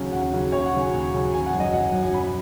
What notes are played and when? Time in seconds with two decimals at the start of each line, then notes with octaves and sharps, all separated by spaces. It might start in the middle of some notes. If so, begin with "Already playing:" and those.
Already playing: D#2 C#3 F#3 C#4
0.12 D#2 F#5
0.33 C#3 F#3 C#4
0.52 D#2 C#5
0.66 F#5
0.73 C#3 F#3
0.79 G#5
0.94 D#2
1.14 C#3 F#3
1.33 G#1 G#5
1.46 F#5
1.53 F#2
1.58 F#3 D#5
1.73 G#1 F#5
1.93 F#2 F#3
2.02 G#5
2.13 F#2 B5